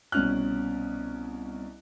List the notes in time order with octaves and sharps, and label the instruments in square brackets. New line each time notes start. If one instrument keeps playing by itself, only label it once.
[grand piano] C2 B2 C#4 F6 F#6